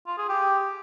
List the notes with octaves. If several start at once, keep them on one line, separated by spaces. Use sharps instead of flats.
F4
G#4
G4